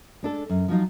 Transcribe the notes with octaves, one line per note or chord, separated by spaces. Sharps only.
G#3 D4 A4
F#2
F3 F#3 D#4 F4